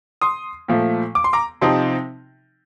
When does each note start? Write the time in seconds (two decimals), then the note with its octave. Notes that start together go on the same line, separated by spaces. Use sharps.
0.21 C6 D#6
0.68 A#2 F3 A3
1.15 D6
1.24 C6
1.33 A#5 D6
1.61 C3 F3 C4 D#4 A5 C6